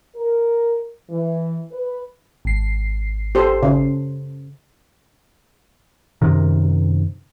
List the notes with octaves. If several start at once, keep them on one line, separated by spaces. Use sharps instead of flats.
A#4
E3
B4
G#1 C7
G4 A4 C5
C#3
F#2 C3 D#3